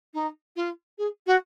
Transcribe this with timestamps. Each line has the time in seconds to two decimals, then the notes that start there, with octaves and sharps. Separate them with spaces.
0.14 D#4
0.56 F4
0.98 G#4
1.26 F#4